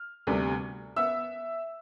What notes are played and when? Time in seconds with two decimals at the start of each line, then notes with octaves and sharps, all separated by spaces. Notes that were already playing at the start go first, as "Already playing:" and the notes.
Already playing: F6
0.27 D2 C3 G3 B3
0.96 B3 E5 E6